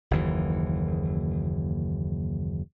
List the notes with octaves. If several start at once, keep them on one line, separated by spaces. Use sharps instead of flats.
F#1 D#2 E3